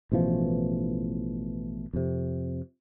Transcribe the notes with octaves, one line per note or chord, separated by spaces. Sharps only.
A1 B2 E3 F3
F2 C3